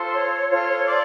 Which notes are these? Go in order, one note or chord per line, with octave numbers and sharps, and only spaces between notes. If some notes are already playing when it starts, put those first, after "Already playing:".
Already playing: F4 A4 C5
C#5
F4 A4 C5 C#5
D5